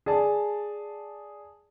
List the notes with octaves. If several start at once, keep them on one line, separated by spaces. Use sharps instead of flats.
G#4 D5 A5